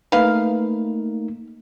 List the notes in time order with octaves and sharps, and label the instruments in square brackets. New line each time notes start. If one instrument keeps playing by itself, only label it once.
[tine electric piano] A3 A#3 D#4 [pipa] B4 F5